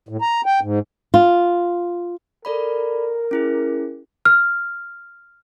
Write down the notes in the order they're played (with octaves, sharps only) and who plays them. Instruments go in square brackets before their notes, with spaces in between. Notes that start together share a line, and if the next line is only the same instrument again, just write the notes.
[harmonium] A2
A#5
G5
G#2
[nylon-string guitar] F4
[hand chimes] A4 D5 B5 [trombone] A#4
[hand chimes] C#4 E4 G#4
[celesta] F6